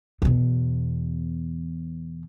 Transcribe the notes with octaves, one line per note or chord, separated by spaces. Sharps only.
E2 B2